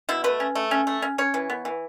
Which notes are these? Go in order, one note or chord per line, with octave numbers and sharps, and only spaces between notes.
B2 E4
A3 B4
C#4
A3
C#4
A3
C#4
C#4 C#5
E3
B3
E3